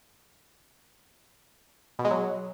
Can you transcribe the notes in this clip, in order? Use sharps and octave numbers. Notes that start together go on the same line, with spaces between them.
B2
G#3
F#3